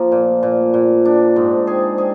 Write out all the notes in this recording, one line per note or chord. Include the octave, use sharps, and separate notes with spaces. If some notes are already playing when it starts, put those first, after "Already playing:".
Already playing: F3 A#3
A#2
A#2
A#2
D4
G#2
G#4
G#4